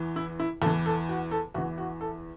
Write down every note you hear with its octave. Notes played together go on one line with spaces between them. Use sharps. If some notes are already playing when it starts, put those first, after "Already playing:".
Already playing: E2 E3
E4
E4
E2 E3 A4
A4
F#4
A4
E2 E3 F#4
F#4
A4